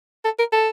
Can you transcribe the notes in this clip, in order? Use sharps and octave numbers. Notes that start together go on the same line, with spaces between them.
A4
A#4
A4